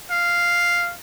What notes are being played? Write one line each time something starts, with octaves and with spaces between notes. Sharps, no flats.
F5